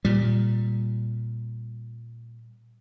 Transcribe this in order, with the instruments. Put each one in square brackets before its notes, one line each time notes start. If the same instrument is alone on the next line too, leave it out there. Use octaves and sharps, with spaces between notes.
[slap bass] A#2 G3